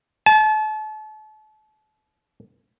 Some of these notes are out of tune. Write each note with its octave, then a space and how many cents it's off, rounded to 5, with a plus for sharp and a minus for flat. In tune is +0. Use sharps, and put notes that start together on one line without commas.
A5 -35